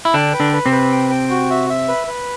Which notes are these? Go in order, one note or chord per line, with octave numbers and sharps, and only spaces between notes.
E4
D3 D4 G5
B4
D3 D4
B4
C3 C4
B4
G5
G5
F#4
E5
E5
B4
B4